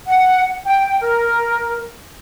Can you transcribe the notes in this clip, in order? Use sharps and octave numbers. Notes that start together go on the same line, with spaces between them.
F#5
G5
A#4